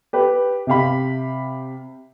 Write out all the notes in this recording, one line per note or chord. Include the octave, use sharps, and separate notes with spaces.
G4 B4
C3 G4 F5 B5